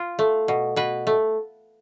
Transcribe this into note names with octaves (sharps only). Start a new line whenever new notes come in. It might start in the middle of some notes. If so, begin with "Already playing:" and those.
Already playing: F4
A3
B2
B2 B4
A3